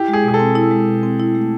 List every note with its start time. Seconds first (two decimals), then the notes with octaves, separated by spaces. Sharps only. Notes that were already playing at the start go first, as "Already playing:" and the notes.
Already playing: E4 G4
0.08 G#3
0.13 G#4
0.23 B2
0.28 G#4
0.34 A4
0.40 C4
0.55 E4
0.71 G#3
0.87 B2
1.03 C4
1.20 E4
1.35 A3